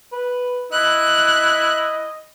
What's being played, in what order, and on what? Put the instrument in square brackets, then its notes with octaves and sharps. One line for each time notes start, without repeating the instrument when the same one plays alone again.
[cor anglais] B4
[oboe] E4 [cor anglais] D#5 [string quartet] F#6